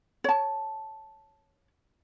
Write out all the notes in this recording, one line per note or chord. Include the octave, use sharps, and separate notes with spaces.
C#5 A5